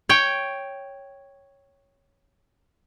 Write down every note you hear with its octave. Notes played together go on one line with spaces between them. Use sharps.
C#5 G5